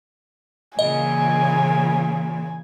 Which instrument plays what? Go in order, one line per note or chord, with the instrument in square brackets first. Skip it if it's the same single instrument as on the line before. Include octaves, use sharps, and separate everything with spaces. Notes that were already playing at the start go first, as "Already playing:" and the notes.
[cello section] A#2 C#3 E3 [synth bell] D#5 [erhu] G#5